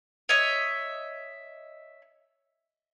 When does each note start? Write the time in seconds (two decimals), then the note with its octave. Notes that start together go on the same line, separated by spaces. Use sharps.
0.29 C#5 D#5 E5